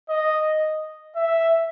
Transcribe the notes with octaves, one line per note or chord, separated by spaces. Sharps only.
D#5
E5